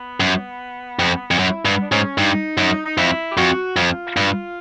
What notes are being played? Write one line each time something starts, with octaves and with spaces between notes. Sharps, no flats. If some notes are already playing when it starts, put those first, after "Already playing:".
Already playing: B3
F#2
F2
F2
F#2 E4
G2 B3
D4
G#2 C#4
G2 D#4
F#2
D#4
F2 E4
G4
F2 F#4
F2 F4
G2